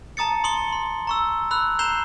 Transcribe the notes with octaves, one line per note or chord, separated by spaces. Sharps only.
A5 A#5 D#6 A6 C#7
C6 D#6 C#7 G7
C6
A#5 C#6 E6
B5 E6 F#6
A#5 G6 C7 E7 F7 G7